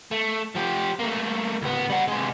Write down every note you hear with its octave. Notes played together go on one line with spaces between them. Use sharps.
A3
F3 G4
A3 A#3
C#2 B3
G3 F#5
C3 G#3